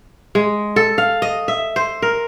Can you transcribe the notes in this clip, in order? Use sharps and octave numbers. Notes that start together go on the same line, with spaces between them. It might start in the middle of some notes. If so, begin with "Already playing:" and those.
G#3
A4
F5
D#5
E5
C5
A#4